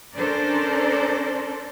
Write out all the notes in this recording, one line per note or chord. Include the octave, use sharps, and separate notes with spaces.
C#4 D4 A4 A#4 C5 D5